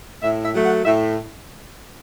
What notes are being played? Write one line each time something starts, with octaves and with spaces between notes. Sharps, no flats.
A2 E5
E5
F#3 A3
F#5
A2 E5